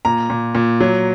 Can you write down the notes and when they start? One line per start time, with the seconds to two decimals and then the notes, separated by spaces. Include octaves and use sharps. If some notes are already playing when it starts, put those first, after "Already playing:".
0.05 A#2 A#5
0.30 A#2
0.55 A#2
0.80 F#3